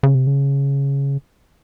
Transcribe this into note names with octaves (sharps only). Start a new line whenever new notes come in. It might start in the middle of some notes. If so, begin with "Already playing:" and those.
C#3
C3
C#3